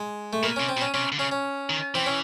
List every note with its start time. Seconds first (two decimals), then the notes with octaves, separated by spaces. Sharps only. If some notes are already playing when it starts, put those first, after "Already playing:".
Already playing: G#3
0.33 A3
0.43 B2 A#3
0.56 C3 C#4
0.69 C4
0.77 B2
0.81 C#4
0.94 C3 C#4
1.12 D3
1.19 C#3 C#4
1.32 C#4
1.70 D#3
1.95 E3 C4
2.06 C#4